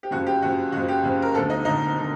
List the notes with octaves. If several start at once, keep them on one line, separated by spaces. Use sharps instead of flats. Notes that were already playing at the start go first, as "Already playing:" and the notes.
G4
F#1 F2 C#3 F#4
G4
F#1 F2 C#3 F#4
F#1 F2 C#3 F#4
G4
F#1 F2 C#3
A#4
E1 D2 D3 A4
D#4
E1 D2 D3 D#4
D3